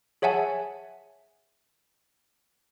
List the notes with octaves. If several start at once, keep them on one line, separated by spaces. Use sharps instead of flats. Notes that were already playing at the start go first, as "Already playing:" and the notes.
G#4 C#5 E5 F#5 G#5 A5